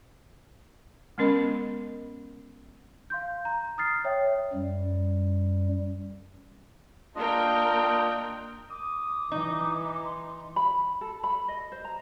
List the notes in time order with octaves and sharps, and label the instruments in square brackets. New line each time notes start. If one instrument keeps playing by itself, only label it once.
[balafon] G#3 B3 C#4 A#4 D#5 B5
[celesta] F5 C6 G6
A#5
D#6 F6 A6 C7
C#5 E5 G5
[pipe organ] F#2 G3
[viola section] A#3 A#4 G5 [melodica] D4 F4 D#5
[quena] D6 [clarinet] D#6
[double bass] E3 [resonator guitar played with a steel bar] D#4
[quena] C6
[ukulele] B5
A4
B5
D#5
C5
A#5